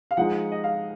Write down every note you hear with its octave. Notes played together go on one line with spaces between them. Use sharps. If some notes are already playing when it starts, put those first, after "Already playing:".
F5
F3 G#3 D#4 F#5
D#5
F5